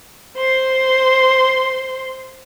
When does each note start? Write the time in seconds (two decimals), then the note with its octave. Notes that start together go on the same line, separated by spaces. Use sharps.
0.36 C5 C6